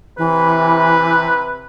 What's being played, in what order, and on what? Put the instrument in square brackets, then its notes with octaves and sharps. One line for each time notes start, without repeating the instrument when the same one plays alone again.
[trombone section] C3 B4 [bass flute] E3